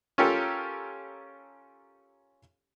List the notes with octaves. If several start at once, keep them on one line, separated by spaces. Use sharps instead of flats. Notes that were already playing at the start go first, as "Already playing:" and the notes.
C#4 F4 G4 A4 A#4